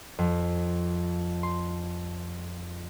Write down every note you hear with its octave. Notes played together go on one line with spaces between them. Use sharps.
F2
C6